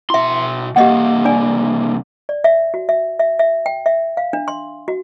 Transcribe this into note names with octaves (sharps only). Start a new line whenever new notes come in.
B2 E4 E5 C6
C2 A#3 G4 D#5 F#5
D4 D5 G#5
D5
E5
F#4
E5
E5
E5
G5
E5
F5
D4
C6
F#4